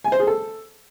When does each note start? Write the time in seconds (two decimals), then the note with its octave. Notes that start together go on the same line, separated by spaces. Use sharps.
0.04 G#5
0.12 C5
0.20 G#4
0.27 A4